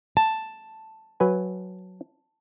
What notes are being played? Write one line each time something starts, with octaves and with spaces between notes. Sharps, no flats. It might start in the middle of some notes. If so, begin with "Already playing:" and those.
A5
F#3 B4 G#5